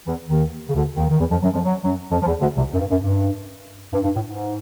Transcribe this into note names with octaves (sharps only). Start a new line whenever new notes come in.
E2 E3
D#2 D#3
C#3
D2 D3
D#2 D#3
D#3
E2 E3
F2 F3
F#2 F#3
F2 F3
F#3
F#2 F#3
F2 F3
F3
E2 E3
D2 D3
C2 C3
F#2
G2
F#2
G2
G2
G2
A2
G#2